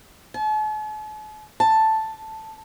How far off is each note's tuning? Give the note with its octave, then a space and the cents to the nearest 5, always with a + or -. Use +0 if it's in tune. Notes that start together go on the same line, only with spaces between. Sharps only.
A5 -45
A5 +0